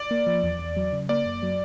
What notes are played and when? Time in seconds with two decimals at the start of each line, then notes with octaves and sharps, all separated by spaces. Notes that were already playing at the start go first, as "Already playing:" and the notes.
Already playing: D5
0.11 A#3
0.27 F3
0.43 E2
0.59 E2
0.76 F#3
0.92 C#3
1.09 A#3 D5
1.26 F#2
1.43 F#3